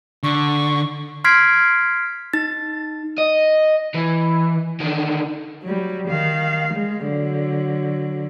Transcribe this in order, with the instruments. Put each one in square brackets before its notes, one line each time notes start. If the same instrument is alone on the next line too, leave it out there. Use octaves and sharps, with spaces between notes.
[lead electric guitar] D3 [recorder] C#6
[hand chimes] C6 F6 G#6 B6 C7 D7
D#4 A6
[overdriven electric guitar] D#5
E3
D3 D#3
[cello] F#3 G3
D#3 F5
G#3
D3 F#3